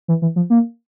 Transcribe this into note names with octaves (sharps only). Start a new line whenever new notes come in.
E3
E3
F3
A#3